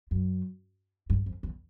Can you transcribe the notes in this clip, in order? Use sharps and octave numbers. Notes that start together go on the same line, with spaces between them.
F#2
G2
F2
E2